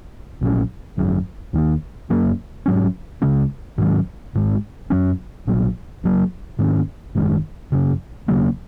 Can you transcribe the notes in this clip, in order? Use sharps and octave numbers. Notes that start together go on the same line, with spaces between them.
A#1 A#2 F#3 C#4
G#1 F#2 F#3 C#4
D#2 D#3 A#3
F#2 F#3 A#3 C#4
G#2 F#3 C#4
C#2 C#3 G#3 C#4
G#2 D#3 F#3 C#4
G#1 G#2 G#3
F#2 F#3 C#4
A#1 A#2 F#3
F#1 F#2 F#3 A#3
G#2 D#3 A#3 C#4
G#1 F#2 D#3 G#3
F#1 F#2 C#3
D#2 C#3 F#3 A#3